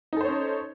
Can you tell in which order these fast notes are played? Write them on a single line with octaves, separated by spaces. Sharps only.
D#4 A4 C5 C#5 C#4